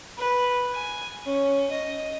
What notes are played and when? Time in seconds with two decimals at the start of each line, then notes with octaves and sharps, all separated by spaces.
0.17 B4
0.73 G#5
1.25 C#4
1.71 D#5